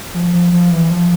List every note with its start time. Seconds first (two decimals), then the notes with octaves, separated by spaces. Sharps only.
0.14 F3
0.33 F3
0.52 F3
0.71 E3
0.91 F3